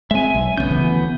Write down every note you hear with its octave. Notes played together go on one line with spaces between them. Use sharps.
G#3 C4 E5 G#5
B1
D2 F#3 B3 C#4 G6
D2 C#3 E3